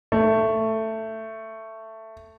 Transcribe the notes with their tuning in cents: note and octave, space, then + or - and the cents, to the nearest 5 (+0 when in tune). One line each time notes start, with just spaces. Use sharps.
A3 +10